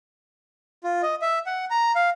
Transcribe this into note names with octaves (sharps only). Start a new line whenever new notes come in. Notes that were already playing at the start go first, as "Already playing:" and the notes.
F4
D#5
E5
F#5
A#5
F5